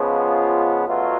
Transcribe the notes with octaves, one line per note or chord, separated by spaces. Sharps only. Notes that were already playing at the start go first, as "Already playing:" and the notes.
Already playing: C#3 F3 G#3 B3
F4
B2 F#3 A3 F4